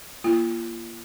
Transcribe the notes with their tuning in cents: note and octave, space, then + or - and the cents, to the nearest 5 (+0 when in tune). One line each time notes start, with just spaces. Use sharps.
A#3 +10 F4 -40